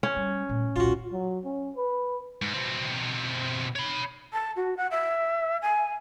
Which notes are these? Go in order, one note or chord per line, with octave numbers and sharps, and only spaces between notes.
C#4
G3
A#2 A3
D#1 B1 F4 F#4
F#3
C#4
B4
G#2
B2 C4
C#5 B5
A5
F#4
F#5
E5
G#5